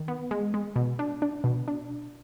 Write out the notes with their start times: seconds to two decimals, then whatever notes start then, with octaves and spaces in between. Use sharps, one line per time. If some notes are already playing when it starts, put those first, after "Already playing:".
Already playing: D#3
0.08 B3
0.31 G#3
0.54 G#3
0.76 B2
0.99 D4
1.22 D4
1.44 B2
1.68 D4